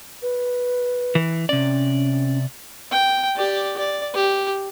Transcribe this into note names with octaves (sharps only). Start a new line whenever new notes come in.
B4
E3
C3 C#4 D5
G5
G4 D5
D5
G4